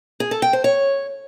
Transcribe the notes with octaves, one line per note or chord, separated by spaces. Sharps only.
G#4
A4
G5
C5
C#5